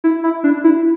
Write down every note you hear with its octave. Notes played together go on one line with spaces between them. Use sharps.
E4
E4
D4
E4